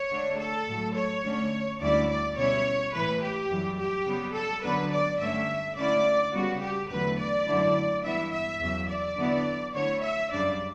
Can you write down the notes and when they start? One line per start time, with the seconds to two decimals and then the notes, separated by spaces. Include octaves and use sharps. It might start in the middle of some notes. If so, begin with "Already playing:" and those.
Already playing: C#5
0.10 D3 A3 D4
0.38 A4
0.67 A2 F#3 A3
0.95 C#5
1.23 D3 A3 C#4
1.80 D2 D3 G3 C#4 E4 D5
2.09 D5
2.36 B2 G3 C#4 E4 C#5
2.93 A2 E3 A3 B4
3.21 G4
3.50 F#2 E3 G3
3.78 G4
4.06 C#3 G3 B3
4.35 A4
4.63 F#2 D3 F#3 B3 D4 B4
4.92 D5
5.20 G2 D3 A3 C#4 E5
5.76 D3 A3 C#4 E4 D5
6.33 C#3 G3 B3 F#4
6.61 G4
6.89 E2 D3 F#3 A3 B4
7.18 D5
7.46 F#2 D3 A3 E4
8.03 G2 E3 B3 E4 E5
8.31 E5
8.59 E2 C#3 F#3
8.88 D5
9.16 D3 F#3 B3 E4
9.73 D3 A3 E4 C#5
10.01 E5
10.29 F#2 C#3 G3 D4 D5